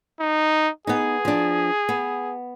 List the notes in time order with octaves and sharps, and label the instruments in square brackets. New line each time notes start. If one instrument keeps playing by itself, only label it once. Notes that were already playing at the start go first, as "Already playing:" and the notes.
[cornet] D#4
[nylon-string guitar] B3 D#4 [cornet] G#4
[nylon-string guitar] F3 D4
B3